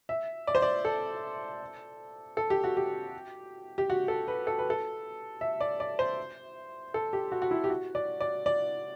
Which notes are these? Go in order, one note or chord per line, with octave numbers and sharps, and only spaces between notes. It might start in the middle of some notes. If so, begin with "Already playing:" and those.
E5
D5
C5
D5
A4
A4
G4
F#4
G4
G4
F#4
A4
B4
A4
B4
A4
E5
D5
D5
C5
A4
G4
F#4
F#4
E4
G4
F#4
D5
D5
D5